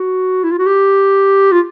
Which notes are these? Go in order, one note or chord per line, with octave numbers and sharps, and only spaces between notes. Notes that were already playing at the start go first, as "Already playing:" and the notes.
Already playing: F#4
E4
F4
F#4
G4
F4